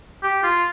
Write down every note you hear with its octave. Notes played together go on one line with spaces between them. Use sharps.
G4
F4